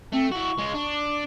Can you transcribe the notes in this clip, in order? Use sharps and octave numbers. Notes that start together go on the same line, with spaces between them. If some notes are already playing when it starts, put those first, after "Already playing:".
A3 C4
E4 F#4 C#6
G#3 F4
D4
D6